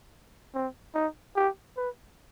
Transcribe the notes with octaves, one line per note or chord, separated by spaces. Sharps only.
C4
D#4
G4
B4